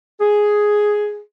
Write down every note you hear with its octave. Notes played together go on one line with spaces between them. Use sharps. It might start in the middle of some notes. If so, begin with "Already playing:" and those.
G#4